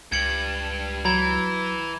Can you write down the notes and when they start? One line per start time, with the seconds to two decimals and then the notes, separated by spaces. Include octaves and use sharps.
0.12 C#2 G2 G#6 C#7 F#7
1.05 E3 F#3 A#5 B5 G#6